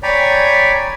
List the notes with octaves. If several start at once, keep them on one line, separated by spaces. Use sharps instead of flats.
C#5 D5 G5 G#5 A#5 B5